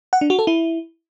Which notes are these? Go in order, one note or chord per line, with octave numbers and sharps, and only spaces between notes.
F#5
D4
F#4
A4
E4